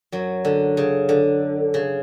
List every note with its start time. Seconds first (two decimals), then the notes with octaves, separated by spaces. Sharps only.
0.12 F#2 F#3
0.45 D3
0.77 C#3
1.09 D3
1.74 C#3